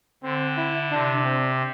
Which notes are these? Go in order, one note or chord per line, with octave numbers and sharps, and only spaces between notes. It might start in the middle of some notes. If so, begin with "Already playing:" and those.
D3 C4
E4
C3 D4
C4